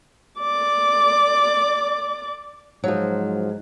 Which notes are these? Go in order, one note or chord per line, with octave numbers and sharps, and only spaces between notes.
D5 D6
G#2 F3 F#3